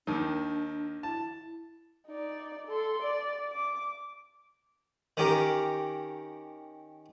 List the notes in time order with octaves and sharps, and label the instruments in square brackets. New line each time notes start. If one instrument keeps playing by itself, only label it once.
[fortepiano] D#2 D#3 [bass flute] D4
[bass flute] E4 [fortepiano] A5
[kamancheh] D#4 D5
A4 C6
D5
D6
[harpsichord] D#3 C#4 G4 A#4